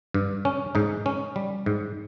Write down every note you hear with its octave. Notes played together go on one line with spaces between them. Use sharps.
G2
C#4
G#2 D#4
C#4
G3
G#2